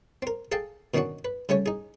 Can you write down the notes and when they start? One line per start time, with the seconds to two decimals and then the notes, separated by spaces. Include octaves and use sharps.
0.22 C4 A#4
0.52 G#4 A4 F5 G5 A5
0.94 B2 D#3 A#3 C#4 D4 F#4
1.25 B4
1.49 C#3 G3 A3 C#4 C#5
1.66 D#4 G#4